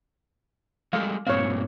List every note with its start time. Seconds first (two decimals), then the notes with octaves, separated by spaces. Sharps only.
0.93 G3 G#3 A4 F5
1.27 G2 A#2 C4 C#5 F5